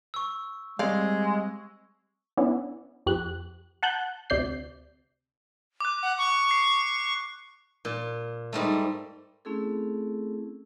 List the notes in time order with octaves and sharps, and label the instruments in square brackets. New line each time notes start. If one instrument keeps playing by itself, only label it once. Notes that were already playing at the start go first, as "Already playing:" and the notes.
[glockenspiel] C#6 E6
[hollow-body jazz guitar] G3 C4 [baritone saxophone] G#3 [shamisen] D5 F5
[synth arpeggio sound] B3 C#4 D4 E4
F2 G4 F#6
F#5 A5 F#6 G6
D2 C3 D5 G6 C7
[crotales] D6 F#6
[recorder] F#5
C#6
[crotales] C7
[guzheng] A#2
G#2 G3 A3
[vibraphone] A3 C4 C#4 E4 G#4 A4